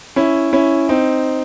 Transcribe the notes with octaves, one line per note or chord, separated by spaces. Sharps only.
C#4 E4
C#4 E4
C4 D#4